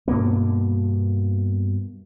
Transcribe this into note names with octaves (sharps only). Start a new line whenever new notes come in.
G2 B2 A#3 B3